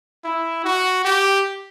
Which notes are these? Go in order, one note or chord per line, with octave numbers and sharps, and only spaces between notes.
E4
F#4
G4